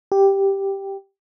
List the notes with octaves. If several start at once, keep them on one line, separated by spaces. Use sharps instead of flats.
G4